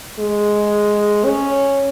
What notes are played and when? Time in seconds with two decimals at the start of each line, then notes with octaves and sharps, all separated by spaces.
0.19 G#3
1.25 C#4